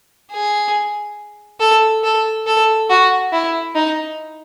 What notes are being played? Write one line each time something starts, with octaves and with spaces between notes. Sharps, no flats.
G#4
A4
A4
A4
F#4
E4
D#4